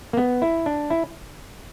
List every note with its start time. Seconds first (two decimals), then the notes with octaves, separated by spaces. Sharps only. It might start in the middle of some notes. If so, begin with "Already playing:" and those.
0.13 A#3
0.17 B3
0.42 E4
0.66 D4
0.90 E4